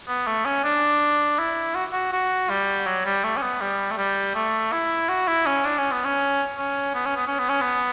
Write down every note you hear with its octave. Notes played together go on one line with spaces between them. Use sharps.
B3
A3
C#4
D4
E4
F#4
F#4
F#4
G3
F#3
G3
A3
C#4
B3
G3
A3
G3
A3
E4
F#4
E4
C#4
D4
C#4
B3
C#4
C#4
B3
C#4
B3
C#4
B3
C#4
B3